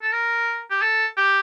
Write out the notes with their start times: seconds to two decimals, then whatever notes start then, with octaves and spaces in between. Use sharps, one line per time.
0.02 A4
0.13 A#4
0.71 G4
0.82 A4
1.17 G4